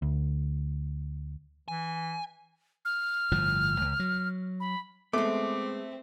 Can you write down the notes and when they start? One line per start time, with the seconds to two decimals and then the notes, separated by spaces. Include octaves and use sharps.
0.02 D2
1.68 E3 G#5
2.85 F6
3.32 G1 A2 F3
3.81 C#2
4.00 F#3
4.60 B5
5.13 G#3 A3 B3 C4 D6